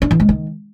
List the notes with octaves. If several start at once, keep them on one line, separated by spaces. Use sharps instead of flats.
D4
E3
G#3
D#3